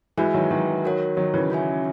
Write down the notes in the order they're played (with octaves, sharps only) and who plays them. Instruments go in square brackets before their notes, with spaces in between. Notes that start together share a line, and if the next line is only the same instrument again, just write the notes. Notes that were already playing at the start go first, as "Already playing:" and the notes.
[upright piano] E3 G#3 [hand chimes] F#4 B4 E5 G#5
[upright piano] D#3 F#3
D#3 F#3
[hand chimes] F#4 A#4 C#5 F#5
[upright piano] D#3 F#3
C#3 E3
[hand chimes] C#4 F#4 C#5 E5 G#5